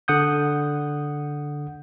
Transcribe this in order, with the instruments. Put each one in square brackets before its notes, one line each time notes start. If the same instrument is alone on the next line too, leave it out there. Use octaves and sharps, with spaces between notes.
[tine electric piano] D3 F#5 D#6 G6